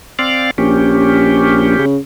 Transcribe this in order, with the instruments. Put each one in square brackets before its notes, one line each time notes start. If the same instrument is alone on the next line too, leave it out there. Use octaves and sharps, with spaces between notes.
[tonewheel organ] C4 D5 F5
[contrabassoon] A#1 [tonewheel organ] C#4 G4
[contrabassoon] C#3